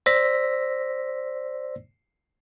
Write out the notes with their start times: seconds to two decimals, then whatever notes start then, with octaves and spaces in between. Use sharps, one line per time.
0.06 C5 D5 E6 A#6 B6